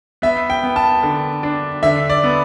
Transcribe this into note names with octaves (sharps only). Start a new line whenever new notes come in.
B3 E5
G5
B3
A5
D3
D4
D3 E5
D5
B3